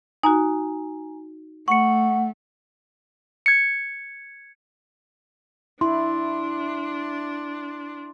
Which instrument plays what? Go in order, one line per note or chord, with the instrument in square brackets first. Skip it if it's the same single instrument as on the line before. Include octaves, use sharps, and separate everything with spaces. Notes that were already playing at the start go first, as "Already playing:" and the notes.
[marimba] D#4 F#4 [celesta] G#5 A#5
[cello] A3 [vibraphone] F#5 [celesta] C#6 C#7
[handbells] G#6 C#7
[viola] D4 [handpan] E4 [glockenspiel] C6